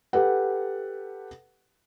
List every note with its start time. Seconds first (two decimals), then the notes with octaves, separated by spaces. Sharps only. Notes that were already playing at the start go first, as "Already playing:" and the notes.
0.13 G4 A4 B4 F#5